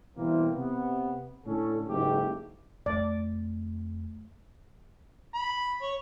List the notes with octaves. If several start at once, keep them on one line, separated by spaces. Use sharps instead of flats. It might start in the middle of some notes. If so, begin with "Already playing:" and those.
B2 E3 G3 A#3 C4
C3 B3
A2 D3 C#4 A4
F#1 G#2 A3 G4
F2 A3 D5
B5
C#5